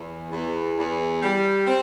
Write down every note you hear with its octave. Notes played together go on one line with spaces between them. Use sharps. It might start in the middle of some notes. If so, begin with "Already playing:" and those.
Already playing: E2
E2
E2
G3
C4